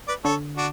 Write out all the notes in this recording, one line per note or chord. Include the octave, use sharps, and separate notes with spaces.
B4 D5
D3 A4 C#5
D4 F#4